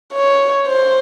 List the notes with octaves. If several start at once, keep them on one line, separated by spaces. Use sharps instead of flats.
C#5
C5